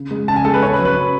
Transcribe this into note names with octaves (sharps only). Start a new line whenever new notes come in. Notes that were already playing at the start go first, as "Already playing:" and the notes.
Already playing: C#3
G#3
C#3 A5
G#5
G#3 A4
B4
C#3 C#5
B4
F#3
B4
C#3